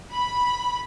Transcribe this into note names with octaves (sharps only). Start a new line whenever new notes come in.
B5